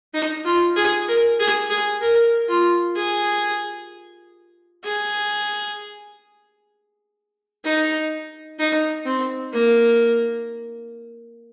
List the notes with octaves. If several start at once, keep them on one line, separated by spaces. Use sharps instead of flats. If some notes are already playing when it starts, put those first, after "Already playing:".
D#4
F4
G#4
A#4
G#4
G#4
A#4
F4
G#4
G#4
D#4
D#4
C4
A#3